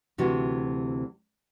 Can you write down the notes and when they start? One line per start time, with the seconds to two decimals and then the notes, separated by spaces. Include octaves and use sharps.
0.18 D2 C3 E3 D4 F#4